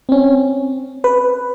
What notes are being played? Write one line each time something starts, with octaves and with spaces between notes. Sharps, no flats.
C4 C#4
B4